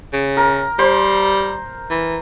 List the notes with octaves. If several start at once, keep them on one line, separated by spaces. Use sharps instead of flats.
C#3
A#4
G3 C5
E3